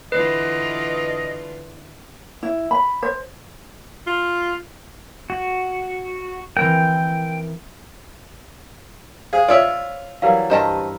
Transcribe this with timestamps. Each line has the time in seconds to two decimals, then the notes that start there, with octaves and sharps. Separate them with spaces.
0.12 D3 E3 F4 B4 D#5
2.43 E4
2.71 B5
3.03 C5
4.07 F4
5.30 F#4
6.57 E3 C4 A#4 G5
9.33 G#4 C5 F5
9.48 F4 C#5 D5 E5
10.22 E3 F#3 G3 A#4 B4 F5
10.50 G2 E4 G4 A#4 C5 D#5 A5